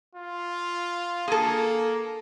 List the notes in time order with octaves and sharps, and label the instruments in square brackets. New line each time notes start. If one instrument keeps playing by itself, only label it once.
[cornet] F4
[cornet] A#3 [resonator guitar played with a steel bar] G#4 A4